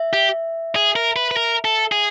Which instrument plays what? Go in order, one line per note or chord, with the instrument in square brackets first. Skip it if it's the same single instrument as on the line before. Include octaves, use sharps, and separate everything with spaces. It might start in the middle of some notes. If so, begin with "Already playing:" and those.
Already playing: [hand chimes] E5
[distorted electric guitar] G4
G#4
A#4
B4
B4
A#4
A4
G#4